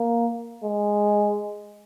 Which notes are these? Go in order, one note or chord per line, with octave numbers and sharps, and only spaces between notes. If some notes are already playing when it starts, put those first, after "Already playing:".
Already playing: A#3
G#3